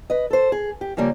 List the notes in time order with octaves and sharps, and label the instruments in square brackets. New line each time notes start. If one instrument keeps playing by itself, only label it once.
[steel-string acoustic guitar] B4 D#5
A4 C5
G#4
G4
C#3 F3 G3 A#3